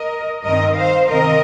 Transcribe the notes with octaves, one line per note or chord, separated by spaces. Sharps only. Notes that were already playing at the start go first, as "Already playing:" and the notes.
Already playing: A#4 D#5
G2 D#3 C4 A#4 D#5
C5 F5
C3 D#3 C4 A#4 D#5